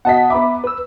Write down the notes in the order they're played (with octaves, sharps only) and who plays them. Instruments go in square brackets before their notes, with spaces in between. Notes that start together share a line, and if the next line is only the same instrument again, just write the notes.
[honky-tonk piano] B2 D#5 B6 [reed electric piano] F#5 A5
[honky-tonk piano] B3 A#5 D6 [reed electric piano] E5 B5
[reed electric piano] B4 E6